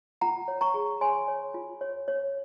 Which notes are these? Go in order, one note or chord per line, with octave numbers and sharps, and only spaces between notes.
F4 F#5 A#5
C#5
A#5 C#6
G#4
C#5 G#5 C6
C#5
F4
C#5
C#5